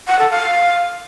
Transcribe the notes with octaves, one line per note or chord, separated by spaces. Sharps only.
F#5
A4
F5